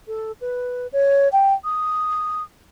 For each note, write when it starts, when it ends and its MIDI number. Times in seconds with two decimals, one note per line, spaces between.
0.08 0.32 69
0.41 0.87 71
0.93 1.29 73
1.33 1.54 79
1.64 2.43 87